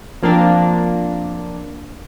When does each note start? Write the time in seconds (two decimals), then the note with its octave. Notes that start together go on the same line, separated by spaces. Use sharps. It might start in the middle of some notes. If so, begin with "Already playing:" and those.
0.23 F3 A#3 C4 D4